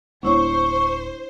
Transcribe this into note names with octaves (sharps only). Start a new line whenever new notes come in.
D1 G#3 B3 D4 E4 C5 C#5 C#6